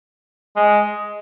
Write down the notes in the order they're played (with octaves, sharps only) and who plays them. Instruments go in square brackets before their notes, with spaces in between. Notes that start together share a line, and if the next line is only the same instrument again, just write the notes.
[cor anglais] G#3